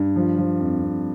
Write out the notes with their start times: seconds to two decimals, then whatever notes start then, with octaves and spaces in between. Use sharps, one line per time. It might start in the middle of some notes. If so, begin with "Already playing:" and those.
Already playing: G2
0.16 F3
0.38 F3
0.60 F2
0.83 F2